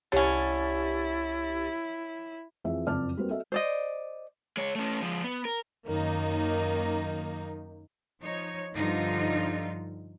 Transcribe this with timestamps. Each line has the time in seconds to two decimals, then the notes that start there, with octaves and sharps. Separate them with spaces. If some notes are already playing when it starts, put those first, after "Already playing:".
0.12 C2 D3 C#4 E4 G4 C#5 A6
2.64 F2 E3 G#4 E5
2.87 F#1 F2 C4 D5 A5 F6
3.17 G3 A#3 C4 F#4 B4 C5
3.30 F#4 A4 D#5 E5
3.52 C5 D5 D#5
4.57 G#3 C#5
4.75 A3 C#4
5.02 F3 G#3
5.24 B3
5.45 A#4
5.86 F#2 D#3 A#3 D#4
8.20 F3 D#4 C#5
8.75 G2 D3 F3 D#4 F4